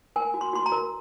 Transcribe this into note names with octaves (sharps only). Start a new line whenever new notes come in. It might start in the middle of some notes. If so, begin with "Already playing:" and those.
A#4 G#5
F#4
C6
F#4 C6
A#5
A#4